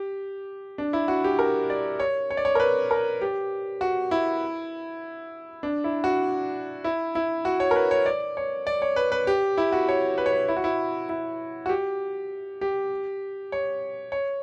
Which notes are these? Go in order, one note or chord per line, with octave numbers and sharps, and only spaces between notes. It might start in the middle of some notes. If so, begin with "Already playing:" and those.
Already playing: G4
D4
E4
F#4
G4
A#4
D5
C#5
C#5
D5
C#5
A#4
B4
A#4
G4
F#4
E4
D4
E4
F#4
E4
E4
F#4
C#5
A#4
B4
C#5
D5
C#5
D5
C#5
B4
B4
G4
E4
F#4
C#5
B4
C#5
B4
E4
F#4
E4
E4
F#4
G4
G4
C#5
C#5